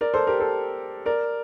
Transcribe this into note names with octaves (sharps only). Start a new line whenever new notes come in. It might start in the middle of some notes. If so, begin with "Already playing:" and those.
A#4 D5
A4 C5
G4 A#4
A4 C5
A#4 D5